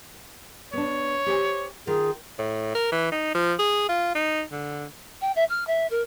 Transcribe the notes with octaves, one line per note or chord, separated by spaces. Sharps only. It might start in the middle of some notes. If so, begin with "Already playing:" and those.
B3 D4 C#5
G4 C5 G#5
D#3 F4 G#4
A2
A#4
E3
D#4
F3
G#4
F4
D#4
D3
G5
E5
F6
E5
A#4